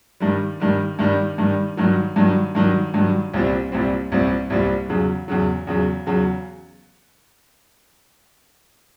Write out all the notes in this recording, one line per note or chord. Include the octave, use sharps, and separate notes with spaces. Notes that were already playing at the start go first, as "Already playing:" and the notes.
G2 D#3 G3
G2 D#3 G3
G2 D#3 G3
G2 D#3 G3
G2 D#3 F#3
G2 D#3 F#3
G2 D#3 F#3
G2 D#3 F#3
C2 A#2 G3 C4
C2 A#2 G3 C4
C2 A#2 G3 C4
C2 A#2 G3 C4
E2 C#3 F#3
E2 C#3 F#3
E2 C#3 F#3
E2 C#3 F#3